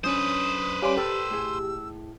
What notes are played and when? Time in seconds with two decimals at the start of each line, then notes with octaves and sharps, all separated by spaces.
0.04 F#2 C#4 D4 B4 C5 D#6
0.82 G3 C#4 F5 C6 D6
0.97 G4 A4 A#4 E6
1.31 A2 G#4